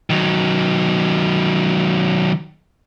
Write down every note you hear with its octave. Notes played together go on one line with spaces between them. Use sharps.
D#3 F#3